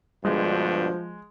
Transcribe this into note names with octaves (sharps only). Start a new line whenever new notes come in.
D2 G2 B2 F3 G#3